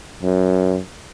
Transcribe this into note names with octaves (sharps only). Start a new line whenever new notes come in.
F#2